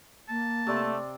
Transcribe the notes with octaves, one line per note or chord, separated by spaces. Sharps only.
A#3 A5
C3 A3 D5 C6